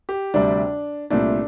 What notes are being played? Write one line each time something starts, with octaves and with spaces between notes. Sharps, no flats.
G4
D2 C3 G3 D4
C2 A#2 A3 D4